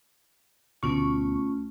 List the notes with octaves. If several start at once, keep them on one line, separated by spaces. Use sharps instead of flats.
D2 B2 A3 C#4 F4 C#6